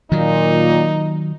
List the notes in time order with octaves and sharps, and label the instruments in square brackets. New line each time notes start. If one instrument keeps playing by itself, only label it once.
[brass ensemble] A#2 [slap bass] D#3 F#3 [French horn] D#4